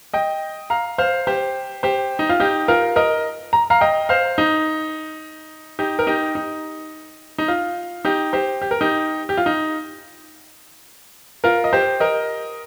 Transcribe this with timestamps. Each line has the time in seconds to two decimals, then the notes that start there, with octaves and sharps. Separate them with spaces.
0.13 D#5 G5
0.70 F5 A#5
0.98 C5 F5
1.27 G4 C5
1.83 G4 C5
2.19 D#4
2.29 F4
2.40 D#4 G4
2.68 F4 A#4
2.96 A#4 D#5
3.53 A#5
3.70 F5 A#5
3.81 D#5 G5
4.09 C5 F5
4.38 D#4
5.79 D#4 G4
5.99 A#4
6.07 D#4 G4
6.35 D#4
7.38 D#4
7.48 F4
8.05 D#4 G4
8.33 G4 C5
8.62 G4
8.71 A#4
8.81 D#4 G4
9.29 G4
9.37 F4
9.46 D#4
11.44 F4 A#4
11.64 D#5
11.73 G4 C5
12.00 A#4 D#5